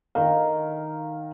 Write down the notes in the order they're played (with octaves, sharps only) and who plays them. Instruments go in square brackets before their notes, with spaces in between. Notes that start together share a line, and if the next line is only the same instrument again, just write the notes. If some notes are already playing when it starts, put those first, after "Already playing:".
[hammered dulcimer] D#3 A#4 [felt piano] F5